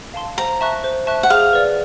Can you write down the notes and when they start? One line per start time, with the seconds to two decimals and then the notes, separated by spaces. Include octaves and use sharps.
0.14 F5 A5 C6
0.38 C5 A#5
0.61 E5 A5 C#6 F#6
0.84 C5
1.07 E5 A5 C#6 F#6
1.23 F#5
1.30 G#4 F5
1.53 B4 D5